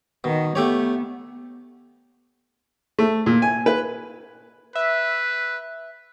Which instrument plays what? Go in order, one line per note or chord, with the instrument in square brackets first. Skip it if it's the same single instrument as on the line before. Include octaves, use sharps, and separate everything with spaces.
[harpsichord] B2 [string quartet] D#3
[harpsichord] A3 G4 C#5 [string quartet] B3
[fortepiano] A3
A#2
G#5
B4
[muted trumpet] B4 [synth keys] E5